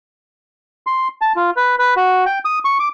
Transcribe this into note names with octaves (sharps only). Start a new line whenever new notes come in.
C6
A5
F4
B4
B4
F#4
G5
D#6
C#6
D6